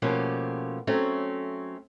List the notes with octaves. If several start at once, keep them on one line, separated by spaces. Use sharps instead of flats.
B2 F3 A3 A#3 C#4 G4
F#3 A3 C4 C#4